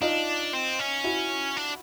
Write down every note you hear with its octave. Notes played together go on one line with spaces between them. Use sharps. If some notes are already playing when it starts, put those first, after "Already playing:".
D4 D#4 F4
C4
C#4
E4 F#4
D4